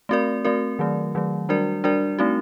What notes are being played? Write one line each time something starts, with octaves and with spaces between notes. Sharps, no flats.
A3 C4 F#4 A#4 D5
A3 C4 F#4 A#4 D5
D#3 F#3 A3
D#3 F#3 A3
G3 D4 F#4 A#4 D5
G3 D4 F#4 A#4 D5
A3 C4 D#4 F#4